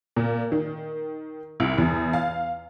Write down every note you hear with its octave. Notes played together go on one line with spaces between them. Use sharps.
A#2
D#3
C2
E2
F5